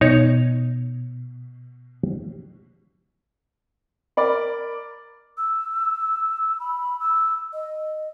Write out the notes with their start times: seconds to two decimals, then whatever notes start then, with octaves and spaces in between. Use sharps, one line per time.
0.01 B2 D#4 C#5
4.17 A#4 D5 B5
5.38 E6
6.60 B5
7.00 E6
7.53 D#5